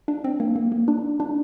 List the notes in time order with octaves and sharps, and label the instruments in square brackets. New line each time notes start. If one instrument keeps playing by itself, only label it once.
[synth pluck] D4
C4
A#3
A#3
A#3
D4
D4